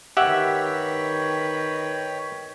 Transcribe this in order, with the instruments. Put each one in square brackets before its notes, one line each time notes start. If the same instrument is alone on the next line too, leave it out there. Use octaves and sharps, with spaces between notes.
[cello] D#3 B4 [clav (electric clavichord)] G4 E5 F#5 [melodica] C#5 G5